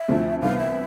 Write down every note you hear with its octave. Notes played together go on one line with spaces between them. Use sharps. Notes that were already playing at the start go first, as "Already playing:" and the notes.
Already playing: E5
D2 C3 F3 A3 E4
C2 C3 E3 B3 F5
E5